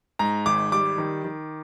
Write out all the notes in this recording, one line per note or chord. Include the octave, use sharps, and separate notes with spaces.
G#2 A#5
G#1 D6
G3 D6
D#3
D#3